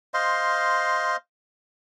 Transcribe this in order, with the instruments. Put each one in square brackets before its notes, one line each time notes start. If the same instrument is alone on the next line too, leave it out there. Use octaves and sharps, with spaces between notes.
[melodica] C5 D#5 F5 C6